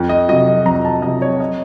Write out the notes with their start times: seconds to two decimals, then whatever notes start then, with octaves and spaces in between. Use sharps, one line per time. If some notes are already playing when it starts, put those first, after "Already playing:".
Already playing: F2
0.09 D#5
0.29 F#3 D#5
0.33 C3
0.65 F2 A#5
0.85 A5
1.02 C3 F#3 D#5
1.22 C#5
1.40 D#5